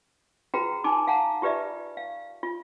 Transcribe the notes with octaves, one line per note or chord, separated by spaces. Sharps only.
F4 F#4 G#4 B4 G5 A#5
D#4 G#5 A5 D6
F5 F#5 A5 A#5
F4 G4 B4 D5 E5
F5
F4